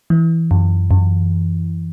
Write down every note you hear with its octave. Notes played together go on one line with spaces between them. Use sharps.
E3
F#2
F#2